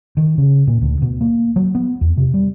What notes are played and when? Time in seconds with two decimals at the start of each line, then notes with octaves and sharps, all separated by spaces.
0.17 D#3
0.38 C#3
0.67 A#2
0.81 D2
1.02 B2
1.21 A#3
1.56 F#3
1.75 B3
2.01 E2
2.17 C3
2.34 G3